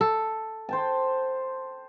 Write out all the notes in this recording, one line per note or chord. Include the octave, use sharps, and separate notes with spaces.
A4
C5 G5 A5